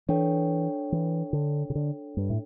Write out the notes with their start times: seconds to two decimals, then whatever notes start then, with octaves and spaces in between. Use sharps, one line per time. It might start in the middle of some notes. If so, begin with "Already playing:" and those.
0.09 E3 D4 A4 C#5 G5
0.92 E3
1.33 D3
1.70 C#3
1.75 D3
2.17 G2
2.30 A2